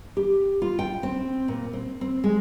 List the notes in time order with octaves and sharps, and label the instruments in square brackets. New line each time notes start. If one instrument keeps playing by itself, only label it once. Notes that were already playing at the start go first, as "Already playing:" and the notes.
[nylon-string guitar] G4
F4
G5
C4
A#2
C4
C4
G#3